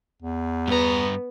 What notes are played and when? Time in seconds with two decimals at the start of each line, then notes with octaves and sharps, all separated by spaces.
0.22 E2
0.68 G2 B3 A#5